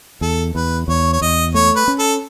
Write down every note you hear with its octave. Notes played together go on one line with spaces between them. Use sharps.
E2 A4
E2 B4
E2 C#5
C#5
E2 D#5
A3 C#5
B4
C#4
A4